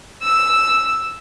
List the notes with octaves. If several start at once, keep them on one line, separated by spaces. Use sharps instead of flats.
E6